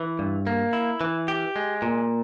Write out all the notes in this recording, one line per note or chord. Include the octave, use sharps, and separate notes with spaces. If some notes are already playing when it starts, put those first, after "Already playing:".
Already playing: E3
G2
A#3
E4
E3
G4
G#3
A#2